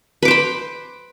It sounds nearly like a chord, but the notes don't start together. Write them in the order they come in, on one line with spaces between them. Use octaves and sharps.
B4 D6 C5 B5